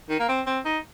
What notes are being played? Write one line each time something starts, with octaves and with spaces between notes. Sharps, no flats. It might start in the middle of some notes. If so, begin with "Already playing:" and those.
D#3
A#3
C4
C4
D#4